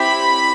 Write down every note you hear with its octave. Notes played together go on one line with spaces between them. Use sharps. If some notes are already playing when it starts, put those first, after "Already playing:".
Already playing: C4 E4 G4 B5